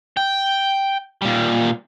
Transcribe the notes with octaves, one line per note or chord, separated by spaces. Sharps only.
G5
A#2 G3